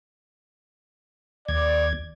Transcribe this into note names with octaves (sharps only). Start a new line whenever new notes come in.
D#2 D5 G#6